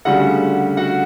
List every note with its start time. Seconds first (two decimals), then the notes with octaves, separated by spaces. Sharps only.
0.05 D2 C#3 G3 F#4 F#5
0.77 F#4 F#5